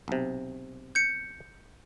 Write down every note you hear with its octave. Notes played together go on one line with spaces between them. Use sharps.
B1 C3
G6 C#7